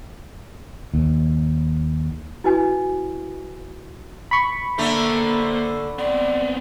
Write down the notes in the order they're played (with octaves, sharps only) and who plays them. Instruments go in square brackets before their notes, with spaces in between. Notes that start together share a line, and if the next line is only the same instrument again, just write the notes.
[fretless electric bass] D#2
[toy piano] E4 F#4 B4 D#5 G#5
[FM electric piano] B5 C#6
[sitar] D3 A3 [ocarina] A#3 [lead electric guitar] C5 A#5
[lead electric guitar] B3 C4 [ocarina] D5